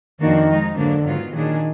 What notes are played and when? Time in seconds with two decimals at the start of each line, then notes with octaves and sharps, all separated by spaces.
0.19 F2 D#3 F3 A#3 D4 F#4
0.48 F3 G#3 D#4
0.76 G#2 D3 F#3 A#3 D4
1.05 G#2 D#3 F#3 B3 F4
1.33 A#2 D#3 F#3 D4 G#4